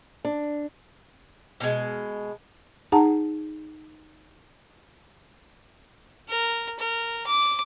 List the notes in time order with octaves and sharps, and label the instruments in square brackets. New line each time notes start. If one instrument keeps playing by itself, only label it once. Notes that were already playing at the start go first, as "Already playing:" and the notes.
[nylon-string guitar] D4
[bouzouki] B2 G#3
[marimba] D#4 G#4 F#5 A5 A#5
[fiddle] A#4
A#4
D6